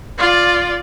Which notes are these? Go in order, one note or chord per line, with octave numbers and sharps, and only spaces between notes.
F4 D5